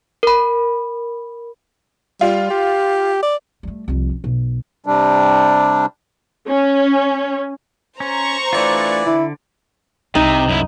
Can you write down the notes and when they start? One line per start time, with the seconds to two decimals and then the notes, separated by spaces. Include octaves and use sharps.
0.23 A#4 B5
2.21 G3 F4
2.50 G4
3.23 D5
3.63 G3 A3
3.88 C2 F2
4.11 C#4
4.24 B1
4.86 C3 G3 D4
6.49 C#4
8.00 C#4 C5 A#5 C#6
8.53 E3 A3 D4 F4 D5
9.06 D3 E4
10.15 C2 C3 D#4
10.49 F#2 E4